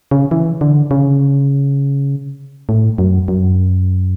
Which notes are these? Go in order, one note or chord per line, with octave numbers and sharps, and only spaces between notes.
C#3
E3
D3
C#3
A2
F#2
F#2